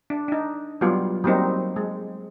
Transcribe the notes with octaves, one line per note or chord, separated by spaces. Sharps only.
D4
D4 D#4
F#3 G3 B3 F4
F#3 G3 A#3 C4 D#4
G#3